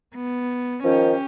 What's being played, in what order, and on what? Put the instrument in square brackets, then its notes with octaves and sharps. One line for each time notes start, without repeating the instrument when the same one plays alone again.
[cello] B3
[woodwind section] D#3 F3 [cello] C#4 G4